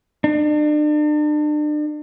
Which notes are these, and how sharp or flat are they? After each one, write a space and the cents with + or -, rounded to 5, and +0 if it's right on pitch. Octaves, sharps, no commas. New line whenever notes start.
D4 +40